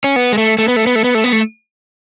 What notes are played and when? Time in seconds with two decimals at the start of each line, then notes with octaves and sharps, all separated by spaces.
0.04 C#4
0.16 B3
0.32 G#3
0.38 A3
0.58 A3
0.68 B3
0.76 A3
0.87 B3
0.96 A3
1.04 B3
1.15 A3
1.24 B3
1.32 A3